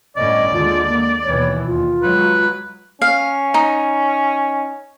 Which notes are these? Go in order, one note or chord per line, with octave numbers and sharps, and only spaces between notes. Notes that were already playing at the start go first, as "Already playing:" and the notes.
G1 A2 C#4 D5 D#5
D#2 D3 G#3 F4
A#3
D#2 B2 E3 C#5
D#2 F4
F#3 G#3 B4
C#4 F5
D#4